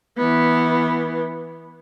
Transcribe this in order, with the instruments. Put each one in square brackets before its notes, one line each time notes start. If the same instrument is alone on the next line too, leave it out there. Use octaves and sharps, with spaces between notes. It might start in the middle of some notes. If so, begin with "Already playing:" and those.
[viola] E3 B3